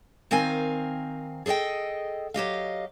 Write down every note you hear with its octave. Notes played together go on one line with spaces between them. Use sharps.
D#3 C4 A#4 F5 G#5
G#4 A4 C5 D#5 G5
F#3 G4 D#5 F5